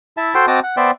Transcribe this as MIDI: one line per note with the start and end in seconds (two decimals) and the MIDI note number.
0.17 0.34 64
0.17 0.34 76
0.17 0.34 81
0.35 0.46 66
0.35 0.46 69
0.35 0.46 72
0.35 0.46 79
0.35 0.46 84
0.35 0.46 88
0.48 0.60 60
0.48 0.60 66
0.48 0.60 75
0.48 0.60 81
0.48 0.60 86
0.48 0.60 87
0.63 0.76 78
0.77 0.91 59
0.77 0.91 72
0.77 0.91 74
0.77 0.91 76
0.77 0.91 79